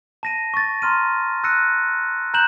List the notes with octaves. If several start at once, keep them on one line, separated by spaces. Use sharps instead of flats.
A5 A#6 D#7
C#6 A6
A#5 C6 F6 D#7
E6 F#6 A#6 C#7 D#7
A#5 F#6 G6 E7 F#7